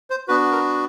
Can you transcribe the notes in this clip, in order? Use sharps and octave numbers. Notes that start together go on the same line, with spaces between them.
C5
B3 D4 F#4 B4
A#4